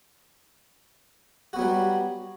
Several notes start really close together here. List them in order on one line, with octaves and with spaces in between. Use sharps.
F#4 B3 F#3 G3